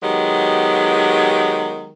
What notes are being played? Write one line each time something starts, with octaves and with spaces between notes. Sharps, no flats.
D#3 F#3 G#3 B3 G4